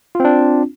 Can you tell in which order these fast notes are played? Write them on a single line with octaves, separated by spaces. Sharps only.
F4 C4 D4